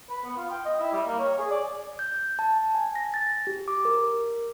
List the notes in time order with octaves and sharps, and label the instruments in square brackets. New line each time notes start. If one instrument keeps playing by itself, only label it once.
[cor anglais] B4
B3
F4
G5
D#5
E4
G3
A#3
C#5
G#4
D5
[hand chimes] G6
A5
G#5
A#6
A6
G4
D6
A#4